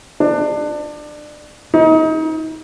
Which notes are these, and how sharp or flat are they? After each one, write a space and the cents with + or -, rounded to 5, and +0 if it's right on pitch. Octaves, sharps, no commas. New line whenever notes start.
D4 +25
D#4 +30